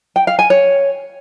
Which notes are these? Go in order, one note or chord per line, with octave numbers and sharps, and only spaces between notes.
G5
F5
G#5
C#5